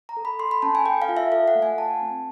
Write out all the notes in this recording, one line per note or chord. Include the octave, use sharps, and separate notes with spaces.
A#5
A4
B5
A4 C6
B5
C#4 A5
G#5
A4 G5
F5
F4
E5
A4 F5
F#5
A3
G#5
F4 A5
C4